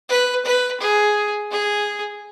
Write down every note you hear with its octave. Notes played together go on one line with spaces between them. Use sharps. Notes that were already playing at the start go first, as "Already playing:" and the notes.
B4
B4
G#4
G#4